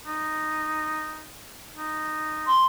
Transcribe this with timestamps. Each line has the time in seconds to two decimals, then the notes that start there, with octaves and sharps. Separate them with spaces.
0.07 D#4
1.76 D#4
2.47 C6